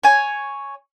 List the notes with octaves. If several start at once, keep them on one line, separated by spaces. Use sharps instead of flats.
C#5 G#5